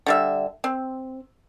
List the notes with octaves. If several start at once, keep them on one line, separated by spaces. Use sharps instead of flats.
D3 G3 E5
C4